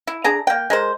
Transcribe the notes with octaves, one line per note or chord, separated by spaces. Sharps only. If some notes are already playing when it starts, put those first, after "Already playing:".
E4
D4 G#4 A#5
A#3 G5
G#3 A#4 C5